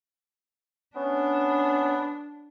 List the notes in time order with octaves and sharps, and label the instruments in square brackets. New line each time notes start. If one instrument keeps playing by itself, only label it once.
[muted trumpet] B3 [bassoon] C#4 [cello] D4